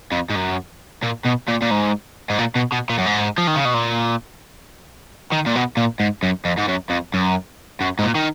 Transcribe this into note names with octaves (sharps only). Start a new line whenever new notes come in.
F2
G#2
F#2
A#2
B2
A#2
A#2
G#2
G#2
A#2
B2
B2
A#2
F#2
G#2
F3
D#3
C#3
B2
A#2
D#3
A#2
B2
A#2
G#2
F#2
F2
G#2
F#2
F2
F#2
F#2
G#2
A#2
D#3